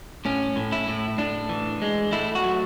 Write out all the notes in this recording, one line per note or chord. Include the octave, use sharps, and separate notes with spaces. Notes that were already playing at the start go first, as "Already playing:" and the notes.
A2 C#4
A2
E4
A2
A2 D4
E3
G#3
A3 E4
F#4
F#3